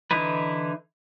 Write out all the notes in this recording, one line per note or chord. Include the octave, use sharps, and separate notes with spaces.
D3 E3 D#4 E4 B4